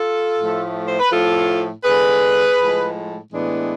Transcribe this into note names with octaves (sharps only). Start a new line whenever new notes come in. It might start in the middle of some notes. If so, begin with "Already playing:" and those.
Already playing: F4 A4
A2 F3 A3
C5
B4
A2 F3 A3 F4 A4
D3 G#3 G#4 B4
A2 F3 G#3
A2 E3 G#3 B3 D4